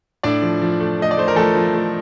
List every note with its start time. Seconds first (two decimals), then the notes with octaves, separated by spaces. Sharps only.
0.23 A2 D4 D5
0.42 F3
0.62 F3
0.80 A3
0.99 A3 D#5
1.11 D5
1.17 A3 C5
1.28 A#4
1.36 F3 A3 A4
1.55 F3
1.74 A3